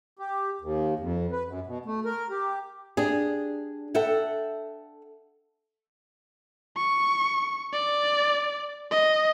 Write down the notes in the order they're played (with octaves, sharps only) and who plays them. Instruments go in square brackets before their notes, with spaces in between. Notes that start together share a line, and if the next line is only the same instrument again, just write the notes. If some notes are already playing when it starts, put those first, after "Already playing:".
[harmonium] G4
D#2
F2
B4
F#2
B2
A3
A#4
G4
[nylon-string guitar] D4 G4 G#4
A4 E5 F#5 G5
[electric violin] C#6
D5
D#5